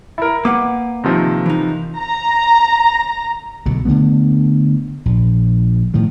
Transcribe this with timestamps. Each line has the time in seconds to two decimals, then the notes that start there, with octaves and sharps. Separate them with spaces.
0.18 E4 A#4
0.45 A#3 B4 F#5 D6
1.04 C3 D#3 F3
1.46 E3 D#4
1.98 A#5
3.66 B1 B2 D3
3.85 D3 D#3 A3 B3
5.06 A#1
5.94 A2 D#3 F3